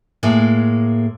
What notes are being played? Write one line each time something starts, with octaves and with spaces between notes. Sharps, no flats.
A2 G#3 A#3